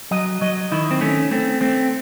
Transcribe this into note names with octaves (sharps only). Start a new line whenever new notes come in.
F#3 D#5
F#3 D#5
D#3 E4
C4
A3 C#4
A3 C4
A3 C4